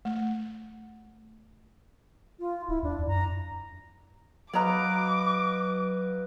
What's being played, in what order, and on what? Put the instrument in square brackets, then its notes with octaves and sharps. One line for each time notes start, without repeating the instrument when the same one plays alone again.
[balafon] A3
[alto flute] F4
[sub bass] D1 [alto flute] E4
[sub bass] E2 [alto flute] D4
[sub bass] F#2 [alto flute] A#5
[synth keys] F#3 [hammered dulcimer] B4 D#5 F5 [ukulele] C#5 A#5 [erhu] D6